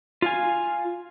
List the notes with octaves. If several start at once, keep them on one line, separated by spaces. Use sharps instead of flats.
F4 F5 G#5